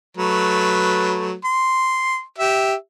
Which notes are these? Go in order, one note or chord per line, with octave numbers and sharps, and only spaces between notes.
F#3 A3 B4
C6
G4 E5